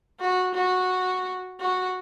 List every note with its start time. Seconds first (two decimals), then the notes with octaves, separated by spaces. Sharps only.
0.20 F#4
0.55 F#4
1.61 F#4